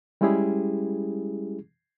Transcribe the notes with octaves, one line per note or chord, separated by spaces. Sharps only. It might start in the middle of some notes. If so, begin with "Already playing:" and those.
G3 G#3 C#4 E4 G4 G#4